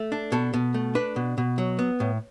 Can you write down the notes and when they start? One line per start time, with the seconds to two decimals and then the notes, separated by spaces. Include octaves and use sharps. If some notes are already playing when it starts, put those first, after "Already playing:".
Already playing: A3
0.12 D4
0.32 B2 A4
0.54 B2
0.74 A3
0.95 D4 B4
1.16 B2
1.38 B2
1.58 F#3
1.79 B3
2.00 A2